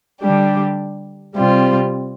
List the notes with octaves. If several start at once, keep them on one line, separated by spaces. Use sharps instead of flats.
D3 G3 D4 G4
C3 G3 C4 F4